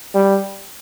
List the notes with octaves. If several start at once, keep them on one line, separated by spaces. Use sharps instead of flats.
G3